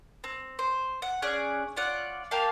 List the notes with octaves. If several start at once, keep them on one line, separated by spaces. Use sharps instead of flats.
C4
C5
F#5
C#4 G#4 D5 F#6
C#4 F4 D5 F#5
A#3 G4 F5 A5